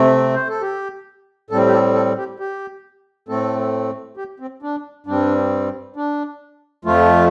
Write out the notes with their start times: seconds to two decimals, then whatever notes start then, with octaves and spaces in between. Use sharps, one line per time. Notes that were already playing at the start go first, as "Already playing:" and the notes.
Already playing: C3 A3 C4
0.35 C5
0.49 A4
0.61 G4
1.50 A2 G3 C4 A4
1.66 G4
1.72 A4
1.95 A4
2.18 G4
2.40 G4
3.28 A2 A3 C4 A4
4.17 G4
4.40 C4
4.63 D4
5.07 G2 G3 C4 D4
5.96 D4
6.85 F2 F3 A3 F4